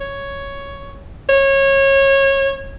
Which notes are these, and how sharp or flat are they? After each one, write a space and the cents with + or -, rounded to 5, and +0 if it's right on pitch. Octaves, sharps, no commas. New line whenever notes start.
C#5 +5
C#5 -25